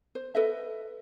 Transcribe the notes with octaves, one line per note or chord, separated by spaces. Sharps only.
C5
A4 B4 D#5 E5